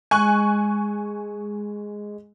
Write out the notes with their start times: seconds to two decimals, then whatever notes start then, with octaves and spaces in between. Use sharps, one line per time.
0.11 G#3 G#5 C#6 F#6